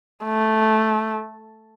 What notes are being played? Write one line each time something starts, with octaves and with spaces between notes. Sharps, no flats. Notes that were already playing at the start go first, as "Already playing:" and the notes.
A3